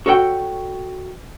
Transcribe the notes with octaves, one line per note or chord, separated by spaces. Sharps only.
F#4 A4 C#5 F#5 G5